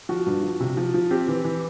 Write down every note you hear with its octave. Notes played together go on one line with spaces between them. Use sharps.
F3 F#4
G2
F3
C3
F3
F3
C4 G4
E3
E3